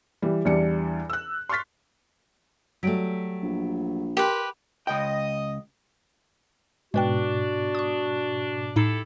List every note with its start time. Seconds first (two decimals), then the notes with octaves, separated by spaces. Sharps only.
0.22 E3 G3
0.45 E2 E3 G3 D4 C#7
1.10 E6 F#6
1.49 C6 C#6 F6 A6 B6
2.83 F#3 G3 A3 B6 D7
3.42 A#1
4.17 G4 A#4 B4 G5 C6
4.87 C#2 D#5 G5
6.94 G#2 B2 G#3 D4 F#4 B4 G5
7.75 C#6 D#6
8.76 A2 D#4 E4 G4 A4 C7